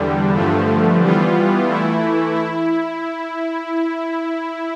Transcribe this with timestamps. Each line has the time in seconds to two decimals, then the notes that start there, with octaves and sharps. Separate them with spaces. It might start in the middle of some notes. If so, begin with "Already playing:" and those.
Already playing: E2 D3 G3
0.35 G2 D3 F3 A3
1.02 E3 G3 B3 F4
1.68 E3 A3 E4
2.35 E4